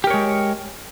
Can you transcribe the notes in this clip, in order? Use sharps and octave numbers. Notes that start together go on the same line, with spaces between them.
G#3 G4 A#4 C#5